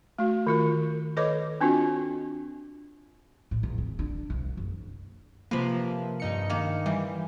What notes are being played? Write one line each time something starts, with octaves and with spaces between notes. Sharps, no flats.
A3 F#4
D#3 F4 A#4
D#3 A4 B4 C#5 D#5 D6
C4 D4 F4 F#4
A2
E2
C4
D4
C2
F#1
C3 F3 A#3 B4 B5
G2 D#4 C#7
D#3 A#3
E3 G3